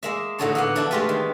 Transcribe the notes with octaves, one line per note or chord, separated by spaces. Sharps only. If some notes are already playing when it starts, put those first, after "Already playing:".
G#3 A#3 E5
A2 D3 F#3 D#4 A4 C#5
A#3 B3 F#5
F3 D4 E4 A4 D5
G#3 A3 F4 G4 B4
D#3